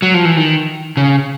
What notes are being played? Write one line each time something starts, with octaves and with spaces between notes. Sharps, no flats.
F#3
F3
E3
D#3
C#3